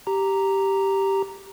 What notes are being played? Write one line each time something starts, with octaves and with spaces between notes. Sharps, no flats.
G4 A#5